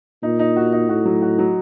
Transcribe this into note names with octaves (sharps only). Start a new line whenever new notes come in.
A#2 D#4
D#4
F#4
D#4
A2 F#4
F#3
F#4
F#3